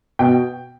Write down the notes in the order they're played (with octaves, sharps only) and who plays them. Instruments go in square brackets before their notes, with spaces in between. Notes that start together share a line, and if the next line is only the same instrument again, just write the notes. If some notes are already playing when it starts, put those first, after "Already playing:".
[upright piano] B2 G5